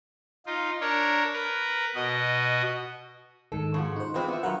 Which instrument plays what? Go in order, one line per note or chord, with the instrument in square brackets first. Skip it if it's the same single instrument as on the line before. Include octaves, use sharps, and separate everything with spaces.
[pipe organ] D#4 F4
D4 A#4 C#5
A#4 B4
B2 F#4 D#5
[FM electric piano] G#2 D#3 [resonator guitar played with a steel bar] A4
[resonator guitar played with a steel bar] C#3 F3 F#4
[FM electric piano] D#4 C5
[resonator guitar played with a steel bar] E3 G#3 C4 [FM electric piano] F4 B4
[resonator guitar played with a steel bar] B3 E5
[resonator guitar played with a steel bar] G2 F#5 [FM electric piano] F#3 A#4 B4